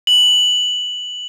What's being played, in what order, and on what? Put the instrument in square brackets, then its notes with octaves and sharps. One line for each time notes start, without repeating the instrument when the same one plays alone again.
[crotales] F#7